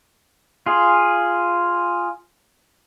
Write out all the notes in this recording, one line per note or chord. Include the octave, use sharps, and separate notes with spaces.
F4 G#4